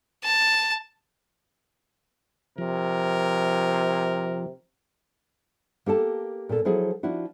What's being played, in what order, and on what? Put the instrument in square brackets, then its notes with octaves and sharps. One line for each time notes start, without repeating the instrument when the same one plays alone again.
[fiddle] A5
[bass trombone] C3 [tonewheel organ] F3 [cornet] A#4
[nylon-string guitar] A#3 G4 A4 A5
A#2 A4
F3 F#3 E4 G#4 A4
F3 D4 E4 F#4